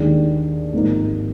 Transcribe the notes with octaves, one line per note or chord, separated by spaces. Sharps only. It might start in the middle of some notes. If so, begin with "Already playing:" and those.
Already playing: D#2 D#3 G#3 D4 G#4
G#1 G#2 F3 A#3 D#4